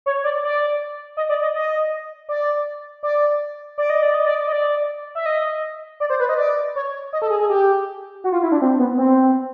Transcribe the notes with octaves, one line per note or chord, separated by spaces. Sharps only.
C#5
D5
D5
D#5
D5
D#5
D#5
D5
D5
D5
D#5
D5
D#5
D5
D#5
D5
E5
D#5
D5
C5
B4
D#5
D5
C#5
D#5
A4
G#4
G#4
G4
F#4
F4
E4
D4
C4
B3
C4